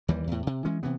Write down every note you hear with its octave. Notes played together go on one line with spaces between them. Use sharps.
D#2 E3 G3
E2 A2
C3
E3 G#3 C#4
C3 E3 B3